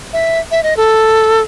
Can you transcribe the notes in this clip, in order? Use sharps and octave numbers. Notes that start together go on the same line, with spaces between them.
E5
E5
D#5
A4